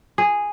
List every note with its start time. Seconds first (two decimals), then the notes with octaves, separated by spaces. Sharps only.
0.18 G#4